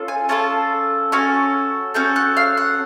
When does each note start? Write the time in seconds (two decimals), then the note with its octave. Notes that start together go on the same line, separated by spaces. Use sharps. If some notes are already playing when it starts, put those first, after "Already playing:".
Already playing: C#4 F4 A4
0.08 G#5
0.29 C#4 F4 A4 A5
1.12 C#4 F#4 A4 G#5
1.94 C#4 F#4 A4 G5
2.16 F#5
2.37 F5
2.57 F#5